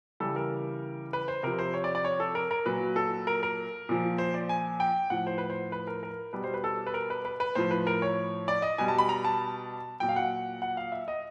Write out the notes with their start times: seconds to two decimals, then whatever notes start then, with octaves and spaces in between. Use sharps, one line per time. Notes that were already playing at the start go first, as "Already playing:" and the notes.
0.20 C#3 E3 G3 A4
0.36 A#4
1.13 B4
1.28 C5
1.43 C3 F3 A#4
1.59 C5
1.74 C#5
1.84 D5
1.95 D5
2.05 C#5
2.20 A4
2.35 A#4
2.51 A#4
2.65 A#2 F#3 B4
2.96 A4
3.27 A#4
3.43 A#4
3.89 A#2 F3
4.18 C5
4.34 D5
4.49 G#5
4.80 G5
5.10 A2 F3 F#5
5.27 C5
5.38 B4
5.50 C5
5.72 B4
5.87 A#4
6.03 A#4
6.33 B2 G3 B4
6.44 C5
6.54 B4
6.64 A4
6.87 B4
6.94 A#4
7.10 B4
7.25 B4
7.40 B4
7.55 A2 F3 C5
7.71 B4
7.87 A#4
8.02 C#5
8.48 D5
8.62 D#5
8.78 B2 G3 G#5
8.88 A5
8.98 B5
9.09 A#5
9.25 A5
10.00 A#2 F#3 G5
10.09 F5
10.16 F#5
10.62 F#5
10.77 F5
10.92 E5
11.08 D#5